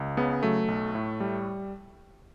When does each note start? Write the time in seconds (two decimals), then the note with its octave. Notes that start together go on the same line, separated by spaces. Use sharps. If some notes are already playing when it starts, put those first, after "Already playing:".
Already playing: C#2
0.17 C#3 B3
0.43 F#3 A3
0.68 B1
0.95 A2
1.20 G3